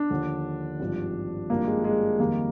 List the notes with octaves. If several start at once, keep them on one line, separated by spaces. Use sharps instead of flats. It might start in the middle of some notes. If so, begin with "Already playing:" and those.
Already playing: D4
D#2 D3 F3
G#1 G2 F3
G#1 G2 F3 A#3
G#3
G#3
F2 D#3 G3 A#3